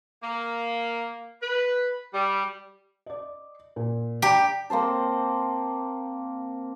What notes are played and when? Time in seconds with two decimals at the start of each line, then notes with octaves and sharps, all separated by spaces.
0.22 A#3
1.41 B4
2.13 G3
3.06 D5 D#5
3.76 A#2
4.22 G4 D5 A#5 B5
4.70 A#3 C4 C5 A5